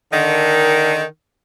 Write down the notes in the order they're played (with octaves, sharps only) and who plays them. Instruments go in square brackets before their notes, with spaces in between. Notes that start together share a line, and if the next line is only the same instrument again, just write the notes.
[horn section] D3 D#3